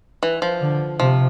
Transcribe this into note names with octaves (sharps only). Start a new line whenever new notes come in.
E3
F3
D3
C3 F3